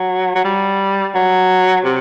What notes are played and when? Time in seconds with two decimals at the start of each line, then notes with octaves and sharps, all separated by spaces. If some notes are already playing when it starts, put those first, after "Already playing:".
Already playing: F#3
0.35 F#3
0.44 G3
1.15 F#3
1.84 C3